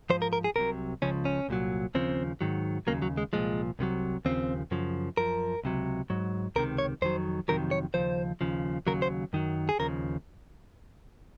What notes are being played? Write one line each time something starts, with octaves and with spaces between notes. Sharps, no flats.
G#2 F3 C5
A#4
A#4
G#4
C2 C3 F#3 A#4
C#2 C#3 F3 C#4
C#4
C2 A#2 F#3
D#2 C#3 F3 C4
G#2 D#3 F#3
D#2 C#3 F#3 A#3
F#3
G#3
C2 A#2 F3 G#3
C2 C3 D#3 F#3
D#2 C#3 F3 C4
F#2 C#3 F3
F#2 F3 A#4
C#2 C3 F#3
G#2 F#3
C#2 C3 D#3 A#4
C#5
F2 D#3 F#3 C5
F2 C3 D#3 F#3 A#4
C#5
D#2 C#3 F3 C5
D#2 C#3 F3
D#2 C#3 F#3 A#4
C5
F#2 D#3 F#3
G#4
D#2 C#3 F3 A#4